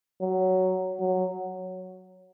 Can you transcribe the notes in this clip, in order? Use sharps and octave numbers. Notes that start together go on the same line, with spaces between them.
F#3
F#3